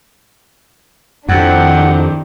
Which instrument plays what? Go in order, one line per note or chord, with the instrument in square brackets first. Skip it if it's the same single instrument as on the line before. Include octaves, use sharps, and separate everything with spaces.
[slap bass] F2 [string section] D#3 C4 D4 [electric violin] E4 G4 [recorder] F#5